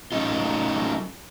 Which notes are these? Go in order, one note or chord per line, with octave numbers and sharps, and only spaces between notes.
F#3 A3 C#4 D#4 F4